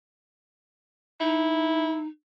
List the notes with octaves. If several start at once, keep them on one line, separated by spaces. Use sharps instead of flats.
D#4 E4